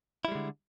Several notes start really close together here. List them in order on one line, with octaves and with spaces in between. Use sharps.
E4 G3 G#3 D3